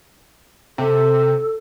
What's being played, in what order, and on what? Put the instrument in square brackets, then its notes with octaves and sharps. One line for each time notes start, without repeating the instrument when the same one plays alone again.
[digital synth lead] C3 [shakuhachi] A4